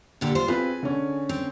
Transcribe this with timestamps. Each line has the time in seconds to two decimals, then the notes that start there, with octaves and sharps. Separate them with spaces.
0.21 A#2 D3 G4
0.35 F4 C5
0.48 C4 F4 G#4 B4
0.83 D3 C#4
1.29 C4